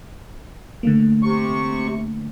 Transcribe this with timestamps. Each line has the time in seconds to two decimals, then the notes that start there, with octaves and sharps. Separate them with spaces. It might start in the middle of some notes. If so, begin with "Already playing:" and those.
0.83 D3 A3 A#3
1.23 C3 C#6